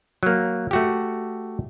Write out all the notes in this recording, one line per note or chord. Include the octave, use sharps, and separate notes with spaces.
F#3 A#3
A3 F#4 G4